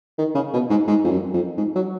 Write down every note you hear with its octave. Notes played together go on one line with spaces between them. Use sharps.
D#3
C#3
B2
G#2
G#2
F2
F#2
F2
G#2
F#3